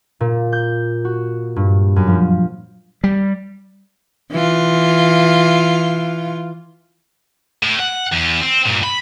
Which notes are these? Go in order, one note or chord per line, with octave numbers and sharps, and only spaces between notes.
A#2
G6
F#4
G2
F#2
F3
G3
E3 F4
A2
F#5
E2
C4
G2 A#2
B5